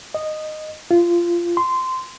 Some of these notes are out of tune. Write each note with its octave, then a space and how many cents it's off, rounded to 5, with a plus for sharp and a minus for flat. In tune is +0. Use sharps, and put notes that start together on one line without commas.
D#5 -10
F4 -20
C6 -15